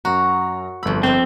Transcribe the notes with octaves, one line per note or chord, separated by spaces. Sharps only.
F#2 F#4 A#5
G1 F2 B5 E6
C4 C5 D#5